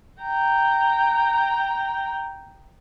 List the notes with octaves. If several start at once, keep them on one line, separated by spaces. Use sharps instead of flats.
G5 A#5